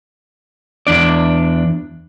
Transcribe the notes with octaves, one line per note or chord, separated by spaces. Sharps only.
E2 D4 D5